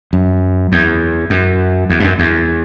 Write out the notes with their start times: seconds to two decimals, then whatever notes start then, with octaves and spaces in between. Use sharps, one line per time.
0.13 F#2
0.72 E2
1.30 F#2
1.90 E2
2.00 G2
2.04 F#2
2.19 E2